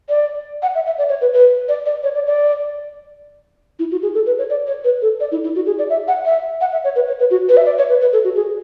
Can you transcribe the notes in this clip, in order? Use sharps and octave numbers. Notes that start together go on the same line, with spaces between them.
D5
F#5
E5
E5
D5
C#5
B4
B4
D5
D5
C#5
D5
D5
E4
F#4
G#4
A4
B4
C#5
D5
C#5
B4
A4
D5
E4
E4
F#4
G#4
D5
E5
F#5
E5
F#5
E5
C#5
B4
C#5
B4
F#4
B4
E5
D5
C#5
B4
B4
A4
F#4
G#4